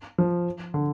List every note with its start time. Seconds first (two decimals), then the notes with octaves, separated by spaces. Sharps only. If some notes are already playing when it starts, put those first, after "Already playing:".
0.18 F3
0.74 D3